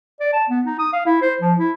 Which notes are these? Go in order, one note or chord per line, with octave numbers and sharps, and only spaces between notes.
D5
A5
B3
D#4
D#6
F5
E4
C5
F3
E4